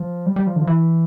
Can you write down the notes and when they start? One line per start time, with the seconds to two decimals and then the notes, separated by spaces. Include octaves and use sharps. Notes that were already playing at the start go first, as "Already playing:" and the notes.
Already playing: F3
0.26 G3
0.36 G3
0.47 F3
0.56 D3
0.61 F3
0.67 E3